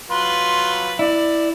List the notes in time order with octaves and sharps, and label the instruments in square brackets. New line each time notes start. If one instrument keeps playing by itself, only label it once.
[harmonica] F#3 F4 B4 [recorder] C6
[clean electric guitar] E4 [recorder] D5